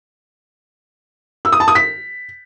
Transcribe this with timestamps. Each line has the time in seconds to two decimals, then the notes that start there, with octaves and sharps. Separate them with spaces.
1.45 E6
1.52 D#6
1.60 A5
1.68 D#6
1.75 B6